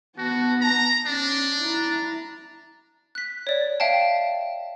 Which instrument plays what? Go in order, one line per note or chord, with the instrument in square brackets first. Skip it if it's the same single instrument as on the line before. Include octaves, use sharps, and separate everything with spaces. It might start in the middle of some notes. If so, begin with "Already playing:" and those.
[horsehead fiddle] B3 A5 [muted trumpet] F#4
[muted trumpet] A#5
[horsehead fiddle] C#4 [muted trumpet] D4
[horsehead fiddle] E4 A#5
[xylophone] F#6 B6
C#5 D5
E5 F5 G5 A5